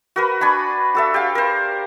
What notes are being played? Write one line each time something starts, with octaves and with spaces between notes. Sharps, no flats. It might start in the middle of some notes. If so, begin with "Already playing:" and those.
F#4 A#4 B4
D4 G#5 B5 C#6
F#4 A4 E5
G4 F5
A#4 C5